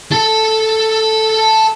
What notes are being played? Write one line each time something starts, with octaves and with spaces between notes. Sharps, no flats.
A4 A5